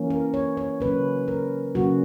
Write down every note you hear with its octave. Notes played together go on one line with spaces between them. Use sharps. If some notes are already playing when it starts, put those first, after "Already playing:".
Already playing: E3 A#3 C#4
A#4
C#5
C#5
C#3 F#3 A#3 C#4 B4
A#4
C#3 F#3 A#3 C#4 F#4